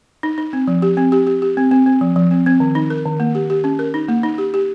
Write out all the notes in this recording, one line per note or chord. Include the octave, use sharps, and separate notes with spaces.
D#4
D#4
C4
F3
G4
C4
G4
G4
G4
C4
C4
C4
F3
F3
C4
C4
D#3
D#4
A#4
D#3
A#3
G4
G4
C#4
A#4
D#4
A#3
D#4
G4
G4